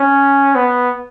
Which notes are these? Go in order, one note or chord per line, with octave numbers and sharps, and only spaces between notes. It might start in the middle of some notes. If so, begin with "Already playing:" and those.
Already playing: C#4
B3